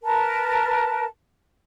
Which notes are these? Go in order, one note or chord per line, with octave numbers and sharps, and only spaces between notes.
A#4 B4 A5